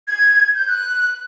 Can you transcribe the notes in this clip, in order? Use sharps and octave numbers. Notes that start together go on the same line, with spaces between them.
G#6
G6
F#6